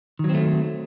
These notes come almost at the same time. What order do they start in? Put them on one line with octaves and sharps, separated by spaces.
D#3 F#3 C4 A3